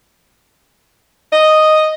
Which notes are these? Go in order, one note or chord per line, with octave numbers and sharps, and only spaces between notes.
D#5